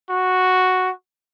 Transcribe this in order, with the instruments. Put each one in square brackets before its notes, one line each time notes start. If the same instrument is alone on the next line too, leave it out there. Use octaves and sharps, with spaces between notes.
[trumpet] F#4